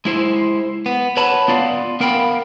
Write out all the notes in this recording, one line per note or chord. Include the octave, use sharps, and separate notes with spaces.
G#3 E4 C5
B3
B4 C#5 F#5 A5 B5
B3 F4 D5 F5
B3 A#4 F5 G5 B5